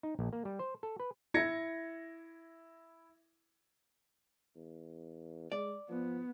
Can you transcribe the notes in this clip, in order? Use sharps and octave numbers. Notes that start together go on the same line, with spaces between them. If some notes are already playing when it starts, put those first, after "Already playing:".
D#4
A#1
A#3
G3
C5
A4
B4
E4 G#6 A#6 C#7
E2
G#3 D5
F3 B3